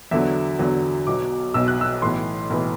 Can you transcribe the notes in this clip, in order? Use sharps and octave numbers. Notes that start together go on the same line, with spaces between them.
E2 D3 F#3 E5
E2 D3 F#3
B1 B2 F#3 D6
B1 B2 F#3 E6
F#6
E6
B1 A2 E3 C6
B1 A2 E3